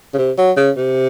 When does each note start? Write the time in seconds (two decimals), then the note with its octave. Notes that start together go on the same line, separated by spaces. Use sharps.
0.14 C#3
0.18 C3
0.38 F#3
0.57 C#3
0.77 C3